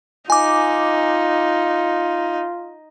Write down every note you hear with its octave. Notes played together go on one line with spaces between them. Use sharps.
D#4 F4 G#5 D6